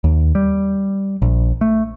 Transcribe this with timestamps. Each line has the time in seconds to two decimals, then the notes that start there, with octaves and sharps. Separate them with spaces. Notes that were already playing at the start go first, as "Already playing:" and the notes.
0.04 D#2
0.35 G3
1.22 A#1
1.61 A3